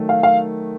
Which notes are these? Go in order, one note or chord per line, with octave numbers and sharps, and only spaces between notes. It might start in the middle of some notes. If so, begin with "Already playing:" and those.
Already playing: D#3 F#3 A3
F5
F5